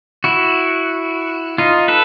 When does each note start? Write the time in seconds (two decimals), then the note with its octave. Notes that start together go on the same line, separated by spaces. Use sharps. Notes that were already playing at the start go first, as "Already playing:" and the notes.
0.24 E4 F#4
1.58 D#4 F4
1.88 A4 B4